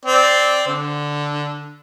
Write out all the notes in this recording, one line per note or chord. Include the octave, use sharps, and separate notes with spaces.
C4 D5
D3